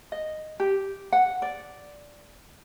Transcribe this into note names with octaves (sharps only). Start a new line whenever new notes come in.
D#5
G4
F#5
D5